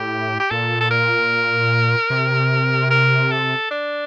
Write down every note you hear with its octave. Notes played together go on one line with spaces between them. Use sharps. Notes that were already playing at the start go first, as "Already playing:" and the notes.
Already playing: A2 G4
G4
A#2 A4
A4
A#4
C3
A#4
A4
D4